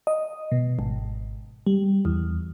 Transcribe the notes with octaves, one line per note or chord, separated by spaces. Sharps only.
D#5
B2
G#1
G3
E2